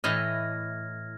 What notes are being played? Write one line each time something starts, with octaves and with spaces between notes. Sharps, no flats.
A2 E3 D#5 F6 G#6 A#6